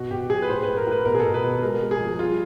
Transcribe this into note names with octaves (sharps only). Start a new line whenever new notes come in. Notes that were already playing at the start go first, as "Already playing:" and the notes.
Already playing: B2 F#4
B2 G4
F#3 G#4
B4
A2 C5
A2 B4
A#4
A2 B4
B2 A#4
G#4
A4
B2
B4
B2
G#3 A#4
G#3
G#4
F3
G3 F4